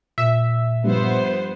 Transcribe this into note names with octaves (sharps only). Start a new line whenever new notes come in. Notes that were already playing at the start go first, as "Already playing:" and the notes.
A#2 E5
G2 F3 G3 B3 C5